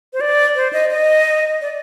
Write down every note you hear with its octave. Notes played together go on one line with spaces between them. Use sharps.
C5
D5
C5
D#5
D#5
D5